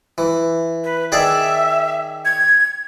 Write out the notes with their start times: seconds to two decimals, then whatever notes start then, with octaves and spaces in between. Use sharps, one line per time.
0.18 E3
0.84 B4
1.12 D#3 G#4 D5 E5
2.25 G#6